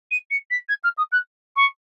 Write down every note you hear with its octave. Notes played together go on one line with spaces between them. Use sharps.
D#7
C#7
B6
G#6
F6
D#6
F#6
C#6